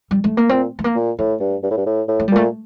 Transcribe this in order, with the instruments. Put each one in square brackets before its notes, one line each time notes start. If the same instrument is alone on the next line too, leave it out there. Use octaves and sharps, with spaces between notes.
[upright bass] G3
A3
A#3
[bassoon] A#2 [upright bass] C4
[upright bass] A3
A#3
[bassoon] A#2
[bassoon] A2 [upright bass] A3
[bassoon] G2
G2
A2
G2
A2
A2
[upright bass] A3
G3
[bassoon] A#2 [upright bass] A3